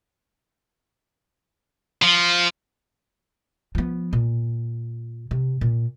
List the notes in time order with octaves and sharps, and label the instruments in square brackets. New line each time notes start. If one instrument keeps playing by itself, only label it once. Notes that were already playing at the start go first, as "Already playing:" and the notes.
[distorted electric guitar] F3
[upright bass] F3 B3
A#2
C3
A#2